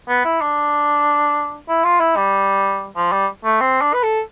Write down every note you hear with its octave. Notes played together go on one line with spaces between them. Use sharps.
B3
E4
D4
E4
F4
E4
G3
F3
G3
A3
C4
D4
B4
A4